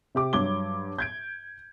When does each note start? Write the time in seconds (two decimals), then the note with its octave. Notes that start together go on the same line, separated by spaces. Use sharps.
0.15 C3 G4 D6
0.33 G2 F#3 D6 G#6 G7
0.98 G6 G#6 D7